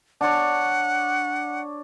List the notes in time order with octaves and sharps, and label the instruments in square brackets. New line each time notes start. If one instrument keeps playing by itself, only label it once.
[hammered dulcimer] D4 C#5 [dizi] F#5